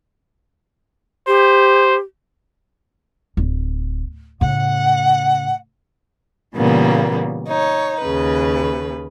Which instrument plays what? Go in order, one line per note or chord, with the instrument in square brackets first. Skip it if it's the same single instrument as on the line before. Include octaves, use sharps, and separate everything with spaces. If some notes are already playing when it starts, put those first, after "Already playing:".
[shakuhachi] G4 [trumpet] C5
[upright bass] D1
[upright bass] A2 C#3 [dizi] F#5
[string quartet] A#2 C#3 E3 G3 A#3 B3
D#4 C#5
D#2 C#3 B4